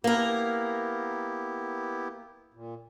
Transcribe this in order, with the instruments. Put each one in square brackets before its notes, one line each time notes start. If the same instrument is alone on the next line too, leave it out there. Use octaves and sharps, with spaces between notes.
[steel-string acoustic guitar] A#3 A#4 [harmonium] B3 E4 G4
[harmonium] A#2